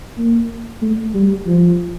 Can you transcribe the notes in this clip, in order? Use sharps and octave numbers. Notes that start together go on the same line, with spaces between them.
A#3
A3
G3
F3